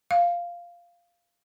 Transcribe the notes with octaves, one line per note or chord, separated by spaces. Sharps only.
F5